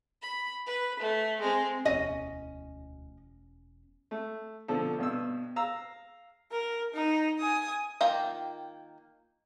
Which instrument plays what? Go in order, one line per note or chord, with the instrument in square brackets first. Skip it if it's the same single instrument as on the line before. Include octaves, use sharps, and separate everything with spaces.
[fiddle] B5
B4
A3
G#3 C4
[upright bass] E1 E3 [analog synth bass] D2 [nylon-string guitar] C#4 [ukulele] D#5
[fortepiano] A3
B2 D3 F3 C4 A4
G2 B2 E6
F5 A#5 E6
[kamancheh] A#4
D#4
G#5 D#6
[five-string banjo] D#3 A#3 F4 G5 A#5